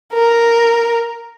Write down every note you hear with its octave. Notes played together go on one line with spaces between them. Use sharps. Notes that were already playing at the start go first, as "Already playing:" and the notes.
A#4